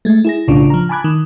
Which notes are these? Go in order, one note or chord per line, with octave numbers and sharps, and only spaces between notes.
G#3 A3
E4 G#4 A#6
B1 A2 C#3 D4 F4
F3 A#5
G#5 A5 B5 D6 F#6 G#6
D#3